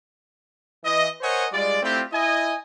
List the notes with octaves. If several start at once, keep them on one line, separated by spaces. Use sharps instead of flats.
E3 D#5
A#4 C5 C#5 D#5 F#5 G#5
G3 G#3 F4 D5
A3 C4 E4 F4 G4 G5
E4 D#5 G#5